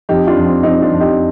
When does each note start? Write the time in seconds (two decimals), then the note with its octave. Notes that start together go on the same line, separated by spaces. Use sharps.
0.09 F2 D#4 G4
0.27 D4 F4
0.36 F2
0.46 C4
0.63 F2 C4 D#4
0.82 D4 F4
0.91 F2
1.00 D#4 G4